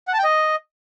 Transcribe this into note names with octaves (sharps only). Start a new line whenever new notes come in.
F#5
A5
G5
D#5